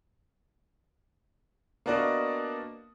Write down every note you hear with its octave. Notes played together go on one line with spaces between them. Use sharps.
A#3 B3 D4 F#4 D5 D#5